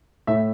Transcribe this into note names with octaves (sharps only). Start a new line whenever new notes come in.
A2 A3 E5